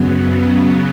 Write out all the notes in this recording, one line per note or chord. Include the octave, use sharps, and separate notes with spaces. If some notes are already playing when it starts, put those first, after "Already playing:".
Already playing: F#2 C#3 F#3 B3
C#3 F#3 B3